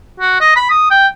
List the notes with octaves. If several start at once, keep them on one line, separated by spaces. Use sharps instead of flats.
F#4
D#5
B5
D#6
G5